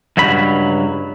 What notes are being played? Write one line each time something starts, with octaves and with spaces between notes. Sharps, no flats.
C#2 G2 F#3 B5